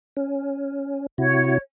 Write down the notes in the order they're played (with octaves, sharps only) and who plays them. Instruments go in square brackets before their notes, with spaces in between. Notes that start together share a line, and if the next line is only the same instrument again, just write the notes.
[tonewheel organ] C#4
[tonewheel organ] C3 E4 F#4 [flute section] C#5